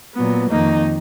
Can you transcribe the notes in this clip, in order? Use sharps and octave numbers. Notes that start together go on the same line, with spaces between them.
A#2 F#3 B3
F2 D#3 A#3 D#4